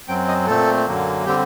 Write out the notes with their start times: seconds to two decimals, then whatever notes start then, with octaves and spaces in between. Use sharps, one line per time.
0.08 F#2 F#3 C4 G5
0.28 D#5
0.47 A#2 A3 C4 A4
0.87 F#2 D3 F#3 A#3
1.25 D3 G3 C4 G4